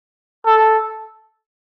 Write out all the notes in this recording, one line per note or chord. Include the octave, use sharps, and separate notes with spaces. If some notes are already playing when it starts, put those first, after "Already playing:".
A4